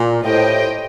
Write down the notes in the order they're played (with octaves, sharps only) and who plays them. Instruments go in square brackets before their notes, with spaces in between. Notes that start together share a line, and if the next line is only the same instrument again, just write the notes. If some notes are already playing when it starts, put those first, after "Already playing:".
Already playing: [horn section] A#2
[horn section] A2 [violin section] G4 C5 D#5 G5